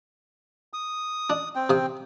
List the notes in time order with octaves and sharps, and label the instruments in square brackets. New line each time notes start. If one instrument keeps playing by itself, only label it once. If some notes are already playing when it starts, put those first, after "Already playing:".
[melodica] D#6
[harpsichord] D4
[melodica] C4 G5
[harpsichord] C3 D#6